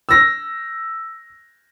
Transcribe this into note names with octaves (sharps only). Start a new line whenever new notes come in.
E6 A#6